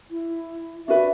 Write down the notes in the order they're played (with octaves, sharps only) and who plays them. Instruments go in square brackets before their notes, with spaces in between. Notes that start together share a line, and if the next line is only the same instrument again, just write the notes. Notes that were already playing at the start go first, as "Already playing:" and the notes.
[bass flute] E4
[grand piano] D4 F#4 B4 [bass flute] E5